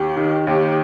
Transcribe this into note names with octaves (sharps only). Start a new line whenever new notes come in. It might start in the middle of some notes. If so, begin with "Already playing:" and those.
Already playing: D#2 G4
D#3
D#2 G4